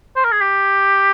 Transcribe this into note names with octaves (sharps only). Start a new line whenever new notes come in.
C5
A#4
G#4
G4